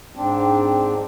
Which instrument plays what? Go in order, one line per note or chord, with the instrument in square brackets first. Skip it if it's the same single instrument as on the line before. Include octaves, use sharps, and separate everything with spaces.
[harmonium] G#2 C4 D4